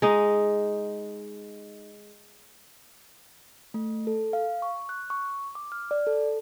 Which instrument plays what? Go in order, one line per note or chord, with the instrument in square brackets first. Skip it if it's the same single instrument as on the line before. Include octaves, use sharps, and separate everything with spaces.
[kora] G#3 D#4
[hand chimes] A3
A4
F5
C#6
F#6
C#6
D6
F6
D5
A4